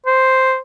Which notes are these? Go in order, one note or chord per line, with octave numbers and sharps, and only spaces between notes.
C5